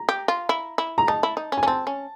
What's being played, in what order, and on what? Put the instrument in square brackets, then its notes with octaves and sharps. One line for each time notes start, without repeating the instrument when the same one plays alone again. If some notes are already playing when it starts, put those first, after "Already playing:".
Already playing: [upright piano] A#5
[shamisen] G4
F4
E4
E4
[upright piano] A#5
[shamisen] D#4 [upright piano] A5
[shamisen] E4
D#4
C#4
[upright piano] G#5
[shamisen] C#4
[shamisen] C4 [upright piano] A5
[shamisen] C#4